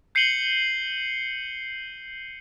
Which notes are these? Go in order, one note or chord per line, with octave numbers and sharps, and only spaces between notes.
G6 C7 C#7 D#7 F#7 G7